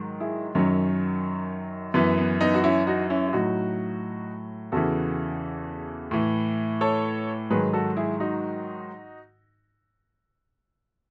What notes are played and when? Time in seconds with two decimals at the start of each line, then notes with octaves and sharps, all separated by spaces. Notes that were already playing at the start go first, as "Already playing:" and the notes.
Already playing: G#2 D#3 F#3
0.20 E4 G#4
0.55 F#2 D#3 F#3 C#4
1.94 F#2 E3 B3
2.18 B3
2.41 B3 D#4
2.54 F#4
2.64 C#4 E4
2.87 D#4 F#4
3.10 C#4 E4
3.28 E4
3.33 A2 F#3 D#4 F#4
4.72 E2 C#3 E3 F#4 A4
6.11 A2 E3
6.81 A4 C#5
7.50 G#2 D#3 F#3 G#4 B4
7.73 F#4 A4
7.97 E4 G#4
8.20 D#4 F#4